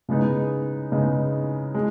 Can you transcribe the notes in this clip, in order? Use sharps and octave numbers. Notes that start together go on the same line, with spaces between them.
C#3 G#3 B3 D#4
C#3 G#3 B3 D#4
G#3